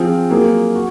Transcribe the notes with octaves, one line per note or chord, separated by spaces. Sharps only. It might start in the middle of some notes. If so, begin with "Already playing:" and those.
Already playing: F3 C4 F4 G#4
F#3 A#3 F4 G#4
F#4